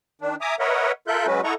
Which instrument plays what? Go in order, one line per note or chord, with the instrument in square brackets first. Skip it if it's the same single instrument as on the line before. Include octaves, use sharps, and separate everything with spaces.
[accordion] D#3 D4
E5 G#5 A#5 D6 D#6
A#4 B4 C#5 D#5 E5 F#5
F4 A4 A#4 E5 F#6 G6
F#3 G#3 C#4 F#4 B4
E4 A4 D#5 F#5 A#5 C#6